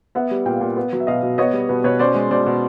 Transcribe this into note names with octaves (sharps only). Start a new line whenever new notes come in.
B3 E5 F#5
G3
A#2 F5 G5
A#2
B3
F#3
E5
B2 D#5 F5
B2
B3 C#5 D#5
G3
B2 B4
B2 B4 C#5
C#4 C5 D5
G#3
B2 C5 D5
B2